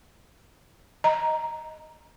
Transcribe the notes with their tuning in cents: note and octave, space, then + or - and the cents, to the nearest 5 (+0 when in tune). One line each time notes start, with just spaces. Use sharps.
D#5 +0 A#5 +0